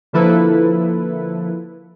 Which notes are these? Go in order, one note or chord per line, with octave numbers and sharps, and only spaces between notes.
D3 F3 A#3 E4 A4 B4